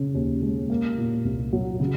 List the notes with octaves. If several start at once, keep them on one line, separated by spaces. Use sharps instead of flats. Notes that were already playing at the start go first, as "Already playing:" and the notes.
Already playing: C#3 C#4
D#2
G#3
A#3
A#2
C2
F#3
C#3